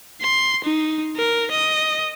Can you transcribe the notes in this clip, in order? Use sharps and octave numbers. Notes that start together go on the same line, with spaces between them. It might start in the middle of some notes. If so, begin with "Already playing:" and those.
C6
D#4
A#4
D#5